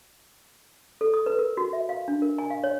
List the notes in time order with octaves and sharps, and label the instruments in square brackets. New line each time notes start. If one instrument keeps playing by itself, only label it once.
[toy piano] A4
D#6
B4
A#4
F#4
E5
F5
D4
A#4
G#5
F5
C#5